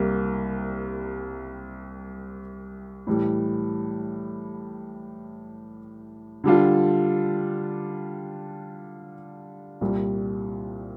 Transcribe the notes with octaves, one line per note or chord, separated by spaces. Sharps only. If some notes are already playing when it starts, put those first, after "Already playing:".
Already playing: C2 C3 G3 A#3
A2 E3 G3
D3 G3 D4 F4
C2 A#2 G3